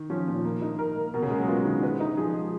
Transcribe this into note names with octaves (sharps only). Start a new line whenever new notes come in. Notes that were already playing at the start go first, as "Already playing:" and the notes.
Already playing: D#3
F3 C#4
A#2
A#3
D#4
A#4
A#3
B2 A#4
C#3
G#3 A#3
F#3
B3 F4
D#3
B4
D#4
F3 G#4
G#3